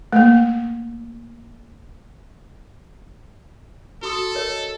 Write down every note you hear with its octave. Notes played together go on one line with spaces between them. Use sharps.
A3 A#3
F#4 A4 C6 D#6
A#4 C#5 D#5